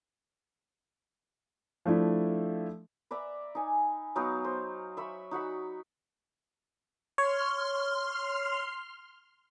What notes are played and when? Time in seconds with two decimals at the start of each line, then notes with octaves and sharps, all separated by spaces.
1.86 F3 A3 D4 E4
3.11 B4 D5 E5 A#5
3.55 D#4 G#5
4.16 F#3 B3 D#4 F5
4.44 C5
4.97 E5 B5 C#6
5.31 D#4 F#4 F#5 B5
7.18 C#5 C6 F6